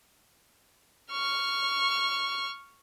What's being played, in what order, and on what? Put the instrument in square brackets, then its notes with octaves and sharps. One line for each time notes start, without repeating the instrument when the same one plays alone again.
[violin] C#6 F6